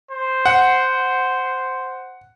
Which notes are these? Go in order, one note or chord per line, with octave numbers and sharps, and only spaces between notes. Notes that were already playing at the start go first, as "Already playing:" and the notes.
C5
F#5